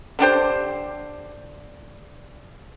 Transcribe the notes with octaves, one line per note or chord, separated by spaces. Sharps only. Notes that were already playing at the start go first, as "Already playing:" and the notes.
D3 D4 G4 C5